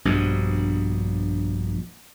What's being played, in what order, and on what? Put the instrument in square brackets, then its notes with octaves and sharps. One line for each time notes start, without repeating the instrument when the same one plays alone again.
[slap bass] A#1 G2 B2